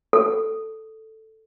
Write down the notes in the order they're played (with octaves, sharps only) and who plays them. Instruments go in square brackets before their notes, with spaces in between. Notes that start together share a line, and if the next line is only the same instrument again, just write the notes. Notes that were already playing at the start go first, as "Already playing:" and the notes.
[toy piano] A4